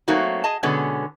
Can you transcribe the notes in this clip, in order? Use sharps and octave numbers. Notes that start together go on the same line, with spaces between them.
F#3 A3 A#3 C4 D#4 F#4
G#4 D#5 A5
B2 D3 G#3 B3 C#4